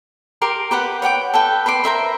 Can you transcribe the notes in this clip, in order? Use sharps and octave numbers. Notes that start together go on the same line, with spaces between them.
G4 A#4 C6
G4 B4 F#5 B5
C#5 F#5 G5 D6
A4 B4 G5
B4 B5 C6 D6
A#4 C5 E5 C6